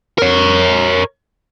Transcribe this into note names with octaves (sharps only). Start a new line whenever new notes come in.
A#4 C#5